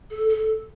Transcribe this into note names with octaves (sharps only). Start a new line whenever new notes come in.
A4
A4